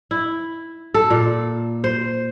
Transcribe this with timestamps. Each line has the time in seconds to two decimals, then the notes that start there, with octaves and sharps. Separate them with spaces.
0.11 E4
0.94 A4
1.10 A#2
1.84 C5